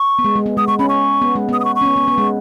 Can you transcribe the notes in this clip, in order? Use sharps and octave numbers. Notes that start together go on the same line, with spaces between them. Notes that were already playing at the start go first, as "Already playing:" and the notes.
Already playing: C#6
B3
G#3
G#3
B3
G#3 D#6
G#3 C#6
C#4 B5
C#6
B3
G#3
B3 D#6
D#6
C#6
C#6
C#4
B3
B3
B3
G#3